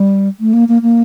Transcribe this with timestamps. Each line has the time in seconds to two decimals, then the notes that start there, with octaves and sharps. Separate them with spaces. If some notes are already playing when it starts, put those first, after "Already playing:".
Already playing: G3
0.40 A3
0.53 A#3
0.68 A#3
0.82 A#3